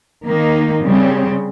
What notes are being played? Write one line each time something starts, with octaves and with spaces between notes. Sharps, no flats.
D#3 A#3 D#4
C#3 G3 C4